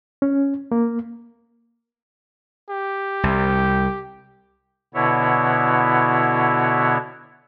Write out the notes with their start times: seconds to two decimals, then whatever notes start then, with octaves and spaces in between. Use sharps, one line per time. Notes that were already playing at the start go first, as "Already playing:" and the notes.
0.22 C#4
0.72 A#3
2.70 G4
3.23 C2
4.94 B2 D3 B3 E4 C#5